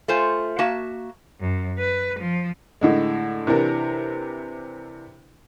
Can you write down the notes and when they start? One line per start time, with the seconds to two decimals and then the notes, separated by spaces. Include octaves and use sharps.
0.08 A3 F4 C5 G#5
0.59 A#3 F#4 E5 A5
1.40 F#2
1.79 B4
2.19 F3
2.81 A2 D3 G#3
3.47 C3 E3 D4 A#4